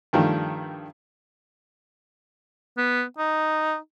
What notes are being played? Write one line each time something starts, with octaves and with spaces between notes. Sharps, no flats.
G2 D#3 F3 G3 A3
B3
D#4